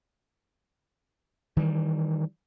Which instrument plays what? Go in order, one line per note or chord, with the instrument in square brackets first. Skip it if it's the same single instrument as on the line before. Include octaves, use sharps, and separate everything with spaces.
[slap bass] D#3 E3 G3